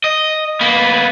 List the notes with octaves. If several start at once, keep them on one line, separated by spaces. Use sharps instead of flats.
D#5
A#3 B3